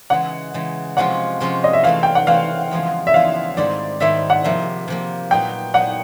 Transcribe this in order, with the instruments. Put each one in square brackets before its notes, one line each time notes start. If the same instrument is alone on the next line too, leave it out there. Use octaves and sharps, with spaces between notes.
[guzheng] C#3 E3 G#3 [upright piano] F#5
[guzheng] C#3 E3 G#3
[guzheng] C3 F3 G#3 C#4 F4 [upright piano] F#5
[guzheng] C3 F3 G#3 C#4 F4
[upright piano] D#5
E5
[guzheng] E3 A3 C4 [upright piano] F5
[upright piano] G5
F#5
[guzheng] E3 A3 C4 [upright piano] F5
[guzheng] E2 C#3 F3 G#3 B3
[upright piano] E5
[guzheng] E2 C#3 F3 G#3 B3 [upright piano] F5
[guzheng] G#2 D#3 G3 C4 E4 [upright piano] D5
[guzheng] G#2 D#3 G3 C4 E4 [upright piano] E5
[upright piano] F#5
[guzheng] C3 F3 A#3 [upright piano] E5
[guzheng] C3 F3 A#3
[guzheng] A#2 F#3 B3 D#4 [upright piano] G5
[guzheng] A#2 F#3 B3 D#4 [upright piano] F#5